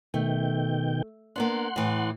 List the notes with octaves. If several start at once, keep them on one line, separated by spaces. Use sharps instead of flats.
B2 D#3 A3 G5
A#3 B3 D4 F#5 C6
A2 E3